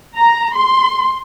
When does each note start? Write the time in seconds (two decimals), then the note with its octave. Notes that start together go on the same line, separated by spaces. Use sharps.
0.16 A#5
0.54 C6